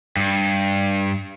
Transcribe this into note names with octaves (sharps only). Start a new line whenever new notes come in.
G2